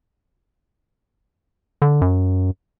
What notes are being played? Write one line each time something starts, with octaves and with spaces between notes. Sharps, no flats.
D3
F#2